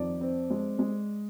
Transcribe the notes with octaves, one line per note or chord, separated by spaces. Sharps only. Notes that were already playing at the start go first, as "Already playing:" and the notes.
Already playing: F2 D#3 D5
C4
G#3
G#3